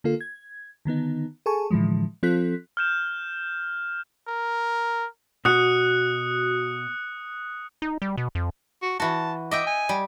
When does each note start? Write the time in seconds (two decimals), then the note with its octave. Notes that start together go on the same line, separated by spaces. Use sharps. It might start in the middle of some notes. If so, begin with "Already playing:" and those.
0.04 D3 A#3 F4 A4
0.21 G#6
0.85 D3 D#3 B3 D#4
1.46 G#4 A4 G#5 A5 C#6
1.71 A2 D3 E3 F3 G#3
2.23 F3 C4 F4 A4 F#6 B6
2.77 F6 G6 E7
4.28 A#4
5.45 B2 F#4 D#6 F#6 C#7
7.82 D#4
8.02 G3
8.17 B2
8.35 F2
8.82 F#4
9.00 E3 F#4 A5
9.51 D#5 E5 G5 D6
9.67 G#5
9.89 G3